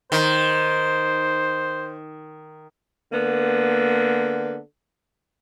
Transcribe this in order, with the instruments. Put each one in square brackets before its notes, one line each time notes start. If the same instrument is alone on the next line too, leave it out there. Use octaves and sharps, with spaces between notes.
[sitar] D#3 [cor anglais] C5
[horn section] D3 A#3 B3